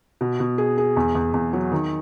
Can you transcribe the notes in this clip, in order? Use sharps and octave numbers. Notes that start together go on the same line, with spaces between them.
B2
B2
G#4
G#4
E2
E2
E2
F#3
D#3